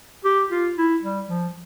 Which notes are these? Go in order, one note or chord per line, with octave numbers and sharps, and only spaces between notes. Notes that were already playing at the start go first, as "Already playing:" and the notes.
G4
F4
E4
G3
F3